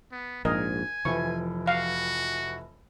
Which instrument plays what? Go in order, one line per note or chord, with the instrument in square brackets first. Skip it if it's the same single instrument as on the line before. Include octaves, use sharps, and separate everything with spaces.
[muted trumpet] B3
[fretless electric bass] A#1 G#2 [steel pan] A#4 D#5 [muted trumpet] G#5
[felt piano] F1 E3 [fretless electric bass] F3 [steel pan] C#6
[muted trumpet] F#4 [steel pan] F5